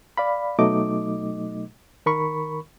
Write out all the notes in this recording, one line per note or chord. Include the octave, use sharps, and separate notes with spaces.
D5 F5 B5
B2 F#3 A3 D#4 D#5 D6
D#3 A#4 B5 C#6